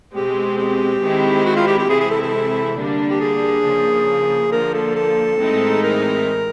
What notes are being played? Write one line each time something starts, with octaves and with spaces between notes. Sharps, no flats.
B2 G#3 C4 G4
G4
D#3 G#3 C4 E4
F#4
F4
G4
G4
C3 E3 G#3 C4 E4 G#4
G#4
A4
A4
D3 G3 A#3 D4
G4
G#4
C#3 F3 A#3
D3 F3 A#3 A#4
A4
A4
A2 E3 G#3 C4 D#4
A#4